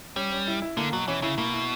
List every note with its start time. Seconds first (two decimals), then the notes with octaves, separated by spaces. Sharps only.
0.16 G3 C#4
0.32 C#4
0.47 E4
0.62 E4
0.77 D3 A#3
0.92 B2 F#3
1.08 E3 C#4
1.22 C#3 E4
1.38 B2 A#3
1.53 E4